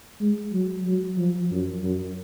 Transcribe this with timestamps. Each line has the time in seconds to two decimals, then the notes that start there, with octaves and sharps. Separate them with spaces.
0.21 G#3
0.53 F#3
0.86 F#3
1.18 F3
1.51 F#2
1.83 F#2